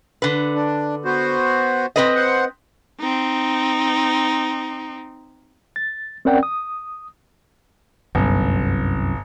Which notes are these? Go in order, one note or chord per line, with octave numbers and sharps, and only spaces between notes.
D3 B4
D4
B3 F#4 C5
C4 B4 D#5
C5 F#5
C4 D#4
A6
C4 C#4 A#4 D5 F#5 G5
D#6
G1 C2 F#2